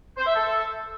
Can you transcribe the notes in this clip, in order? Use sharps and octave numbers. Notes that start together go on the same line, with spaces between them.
C5
E5
A4